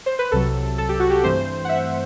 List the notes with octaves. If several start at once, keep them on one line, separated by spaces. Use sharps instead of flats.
C5
B4
C2 C3 F#3 A4
A4
G4
F#4
G4
G2 E3 A3 C4 C5
F#5
E5